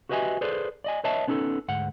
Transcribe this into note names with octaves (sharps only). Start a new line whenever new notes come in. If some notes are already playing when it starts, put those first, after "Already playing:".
F#4 G4 B4 D#5 E5 G#5
G#4 A4 B4 C5 D5
D5 D#5 G#5
B4 C#5 D#5 E5 A5
B3 C#4 D#4 G#4 A4
D2 G#2 F#5